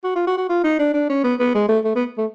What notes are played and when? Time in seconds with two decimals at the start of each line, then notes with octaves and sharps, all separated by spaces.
0.04 F#4
0.16 F4
0.27 F#4
0.38 F#4
0.50 F4
0.64 D#4
0.79 D4
0.94 D4
1.10 C#4
1.24 B3
1.40 B3
1.55 G#3
1.69 A3
1.85 A3
1.96 B3
2.18 A3